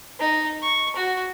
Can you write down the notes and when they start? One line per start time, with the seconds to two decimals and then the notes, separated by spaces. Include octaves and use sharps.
0.20 D#4
0.63 C#6
0.96 F#4